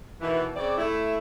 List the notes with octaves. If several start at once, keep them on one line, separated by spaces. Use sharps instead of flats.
B2 D#3 E3
C#3 C4 D5
A3 E4